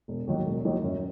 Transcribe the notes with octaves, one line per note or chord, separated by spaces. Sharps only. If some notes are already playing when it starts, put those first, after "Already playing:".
E1
D#2 D#3 F#3
E1
D#2 D#3 F#3
F#2